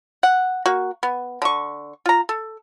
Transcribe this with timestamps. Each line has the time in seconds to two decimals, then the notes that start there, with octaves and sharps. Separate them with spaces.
0.23 F#5
0.66 A#3 F#4
1.03 B3
1.42 D3 C#6
2.06 F4 A#5
2.29 A4